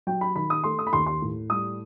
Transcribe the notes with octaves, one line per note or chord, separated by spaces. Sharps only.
F#3 G5
B5
D#3 B5
D#6
A3 C6
D#6
B5
D#2 C6
C6
A2
G3 D#6